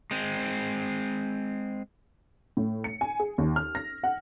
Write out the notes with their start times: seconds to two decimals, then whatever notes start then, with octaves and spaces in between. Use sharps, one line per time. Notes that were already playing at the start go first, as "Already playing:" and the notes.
0.11 G#3 C4
2.57 A2
2.84 C#7
3.01 G#5
3.19 G#4
3.38 D#2
3.56 F6
3.75 A#6
4.03 F#5